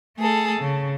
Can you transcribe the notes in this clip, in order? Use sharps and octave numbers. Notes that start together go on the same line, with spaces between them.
A3 G#4 A4
C#3